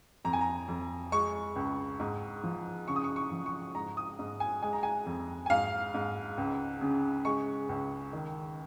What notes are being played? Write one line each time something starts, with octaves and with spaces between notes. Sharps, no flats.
F2 A#5
G#5
A#5
F2
G#3 C#6
C#2
G#2
F3
C#3 C#6
D#6
C#6
C#6
F3
C#6
G#2 A#5
D#6
G#2
G#5
G#3 G#5
A#5
G#5
F2
G#5
G#2 F5
G#2
C#2
C#3
G#3 C#6
C#2
D#3